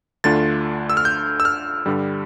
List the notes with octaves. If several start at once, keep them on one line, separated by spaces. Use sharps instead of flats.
D2 D3 A3 D4 F4 A6
E6
F6
G6
E6
F6
G2 D3 G3